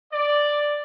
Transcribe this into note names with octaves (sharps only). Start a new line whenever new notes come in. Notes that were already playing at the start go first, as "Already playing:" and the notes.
D5